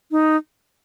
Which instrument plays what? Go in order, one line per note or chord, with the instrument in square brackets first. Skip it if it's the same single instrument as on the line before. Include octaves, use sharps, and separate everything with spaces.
[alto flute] D#4